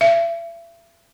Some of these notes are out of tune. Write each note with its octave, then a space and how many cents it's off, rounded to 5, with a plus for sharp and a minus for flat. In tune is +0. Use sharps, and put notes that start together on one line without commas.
E5 +35